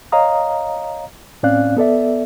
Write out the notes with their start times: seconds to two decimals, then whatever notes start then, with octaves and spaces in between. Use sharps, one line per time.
0.12 C#5 D#5 F5 A#5 D#6
1.43 A2 C4 C#4 D5 F5 F#6
1.77 B3 A4 D5 E5